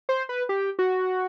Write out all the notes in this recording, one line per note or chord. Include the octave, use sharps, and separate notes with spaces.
C5
B4
G4
F#4